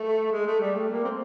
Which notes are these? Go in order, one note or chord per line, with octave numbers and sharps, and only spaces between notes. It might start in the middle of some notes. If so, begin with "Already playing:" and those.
Already playing: A3
G#3
A3
G3
A3
A#3
C4